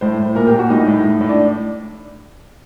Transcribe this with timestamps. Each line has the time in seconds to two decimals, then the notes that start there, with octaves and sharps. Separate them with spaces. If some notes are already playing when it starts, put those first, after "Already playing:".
0.01 A2 C5
0.19 A2
0.35 A#2 A#4
0.47 G4
0.53 A#2
0.59 F#4
0.70 A2 D#4
0.88 A2
1.04 A2
1.21 A2
1.29 D4